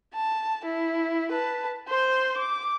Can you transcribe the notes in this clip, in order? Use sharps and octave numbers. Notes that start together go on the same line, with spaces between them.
A5
E4
B4 A5
C5 C6
D6